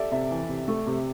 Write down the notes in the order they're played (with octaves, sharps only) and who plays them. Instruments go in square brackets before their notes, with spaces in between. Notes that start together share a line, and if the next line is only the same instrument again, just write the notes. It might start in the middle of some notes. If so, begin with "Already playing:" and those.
Already playing: [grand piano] G4 A4 D5 E5
[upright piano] C3 [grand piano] E5
[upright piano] E3
C3
A3
C3